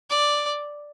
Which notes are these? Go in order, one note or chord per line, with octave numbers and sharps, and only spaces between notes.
D5